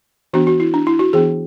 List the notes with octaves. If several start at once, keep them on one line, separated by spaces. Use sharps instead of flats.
E3 B3 D4 F#4
F#4
E4
D4
E4
F#4
E3 B3 D4 G#4